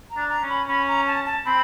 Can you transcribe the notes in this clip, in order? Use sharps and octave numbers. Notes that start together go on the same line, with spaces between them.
A#5
D4
A#5
C#4
B5
C#4 B5
A#5
A5
A5
C4 B5